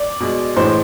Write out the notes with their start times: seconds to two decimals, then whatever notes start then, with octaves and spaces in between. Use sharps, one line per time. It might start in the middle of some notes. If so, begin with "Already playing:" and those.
Already playing: D5
0.20 B2 G#3
0.56 A2 E3 G#3 C5